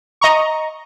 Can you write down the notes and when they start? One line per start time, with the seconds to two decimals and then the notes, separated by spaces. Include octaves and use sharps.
0.21 D#5 A#5 C#6